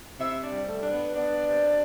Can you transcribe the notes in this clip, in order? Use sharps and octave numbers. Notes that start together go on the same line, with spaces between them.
C3 E4 E5
D4 D5
G3
A3 A4
D4
B3 B4
B3 D4 D5
C3